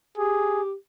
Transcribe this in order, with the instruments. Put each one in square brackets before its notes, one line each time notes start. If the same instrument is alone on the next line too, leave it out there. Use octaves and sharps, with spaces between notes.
[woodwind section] G4 [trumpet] G#4